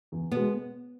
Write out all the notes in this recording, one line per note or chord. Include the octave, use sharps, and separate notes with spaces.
E2
B2 G#3 B3